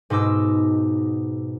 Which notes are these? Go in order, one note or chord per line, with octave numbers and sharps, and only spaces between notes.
G#2 B2 D#4 D6 E6